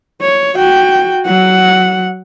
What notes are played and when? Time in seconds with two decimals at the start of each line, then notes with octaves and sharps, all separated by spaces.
0.21 C#5
0.56 F#4 G5
1.26 F#3 F#5